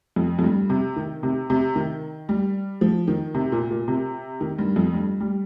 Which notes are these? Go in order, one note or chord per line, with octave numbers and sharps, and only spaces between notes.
F2
F2
G2
C3
D#3
C3
C3
D#3
G3
F3
D#3
C3
A#2
A#2
C3
D#3
G2
F2
G2
G3